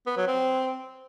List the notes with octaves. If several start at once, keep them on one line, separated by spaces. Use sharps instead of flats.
B3
F#3
C4